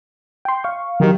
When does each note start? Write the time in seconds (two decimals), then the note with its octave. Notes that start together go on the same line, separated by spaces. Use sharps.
0.45 G5 C6
0.64 F5 C#6
1.00 D#3 F#3 G4